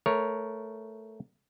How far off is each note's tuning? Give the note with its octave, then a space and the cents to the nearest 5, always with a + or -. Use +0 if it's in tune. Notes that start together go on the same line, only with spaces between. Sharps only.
A3 +0 A#4 +10 C#5 +0